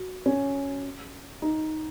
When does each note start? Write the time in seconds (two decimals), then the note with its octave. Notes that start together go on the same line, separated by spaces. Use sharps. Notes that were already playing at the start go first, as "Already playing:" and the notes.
Already playing: F#4
0.26 C#4
1.42 D#4